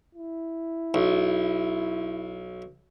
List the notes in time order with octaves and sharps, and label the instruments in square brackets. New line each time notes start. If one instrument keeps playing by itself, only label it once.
[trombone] E4
[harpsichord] B1